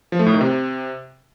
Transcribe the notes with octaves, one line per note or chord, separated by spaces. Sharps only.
F3
A3
A2
D#3
C3